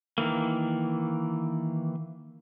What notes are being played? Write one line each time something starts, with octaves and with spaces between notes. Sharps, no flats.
D#3 E3 A#3